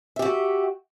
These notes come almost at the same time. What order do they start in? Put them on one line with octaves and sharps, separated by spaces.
E5 G4 F#4